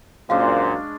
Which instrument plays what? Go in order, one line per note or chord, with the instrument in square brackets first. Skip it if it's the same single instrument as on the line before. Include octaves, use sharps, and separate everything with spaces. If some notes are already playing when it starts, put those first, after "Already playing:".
[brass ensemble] F#2 A#2 [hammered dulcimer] G#3 C#4 D4 [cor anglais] C5 [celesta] F5